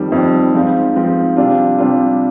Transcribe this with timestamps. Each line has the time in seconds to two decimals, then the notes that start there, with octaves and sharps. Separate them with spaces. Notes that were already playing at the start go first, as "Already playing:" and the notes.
Already playing: F2 D#3 G3
0.12 F2 D#3 G3
0.54 G#2 F3 C4 F4
0.96 G#2 F3 C4 F4
1.37 C3 G3 D4 F4
1.78 C3 G3 D4 F4